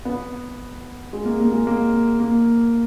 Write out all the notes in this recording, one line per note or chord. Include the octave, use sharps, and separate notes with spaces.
B3
G#3
A#3
A#3
G#3
A#3
A#3